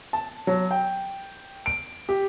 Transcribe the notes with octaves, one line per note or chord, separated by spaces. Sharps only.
A5
F#3
G5
D7
G4